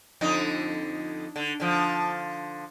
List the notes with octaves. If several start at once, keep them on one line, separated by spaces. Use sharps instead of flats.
F2 D3 D#4
D3
D3 F3